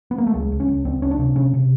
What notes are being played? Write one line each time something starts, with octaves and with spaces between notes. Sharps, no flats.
B3
A#3
A3
C#2 G#3
C#2
C#4
C#2
C#2 C4
C#2 C#4
D4
C3
C3 C#4
C3